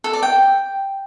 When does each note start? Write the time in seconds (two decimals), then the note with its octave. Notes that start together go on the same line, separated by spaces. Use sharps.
0.04 A4
0.13 D5
0.23 G5